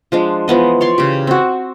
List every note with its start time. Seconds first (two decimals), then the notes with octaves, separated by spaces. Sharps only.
0.12 F3 G#3 D4
0.48 E3 F3 B3 D#5
0.81 C#5 D5 C6
0.98 C#3 G4
1.27 C4 F#4